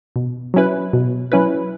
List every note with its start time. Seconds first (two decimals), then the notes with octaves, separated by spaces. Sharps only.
0.16 B2
0.54 F#3 C#4 E4 B4
0.93 B2
1.32 F#3 C#4 E4 B4